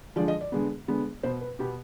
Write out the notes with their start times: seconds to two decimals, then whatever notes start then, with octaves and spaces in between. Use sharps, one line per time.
0.16 D3 F3 G#3 D5
0.28 D#5
0.41 D5
0.52 D3 G#3 B3
0.88 D3 G#3 B3
1.23 B2 B3 C5
1.41 B4
1.59 B2 B3 G4